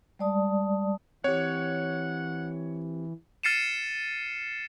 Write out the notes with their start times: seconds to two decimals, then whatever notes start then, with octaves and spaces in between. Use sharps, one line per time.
0.19 G3 G#3 D5 A5 D#6
1.24 E3 C4 G4 C#5 F#5
3.43 F6 A6 C7 C#7 D#7 E7